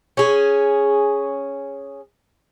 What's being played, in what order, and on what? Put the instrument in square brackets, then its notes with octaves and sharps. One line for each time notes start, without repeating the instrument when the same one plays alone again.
[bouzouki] C#4 G#4